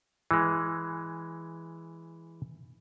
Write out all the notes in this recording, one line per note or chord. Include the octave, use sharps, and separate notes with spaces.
E3 G#3